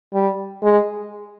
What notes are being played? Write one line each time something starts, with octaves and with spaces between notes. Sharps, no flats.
G3
G#3